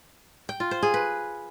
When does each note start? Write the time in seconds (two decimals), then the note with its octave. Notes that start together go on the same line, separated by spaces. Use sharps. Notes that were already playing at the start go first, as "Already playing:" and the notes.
0.49 G5
0.60 F4
0.71 C5
0.83 G#4
0.94 B4